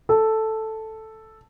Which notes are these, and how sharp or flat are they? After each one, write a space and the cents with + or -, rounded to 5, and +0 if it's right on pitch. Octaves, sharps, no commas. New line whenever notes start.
A4 +0